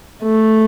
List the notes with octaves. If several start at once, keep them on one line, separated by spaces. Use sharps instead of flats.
A3